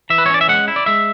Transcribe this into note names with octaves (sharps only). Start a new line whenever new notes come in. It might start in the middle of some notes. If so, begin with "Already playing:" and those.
E3 E5
B4
C#5
C#4 D5
E5
G#3 F#5
E4
D5
G#3 E5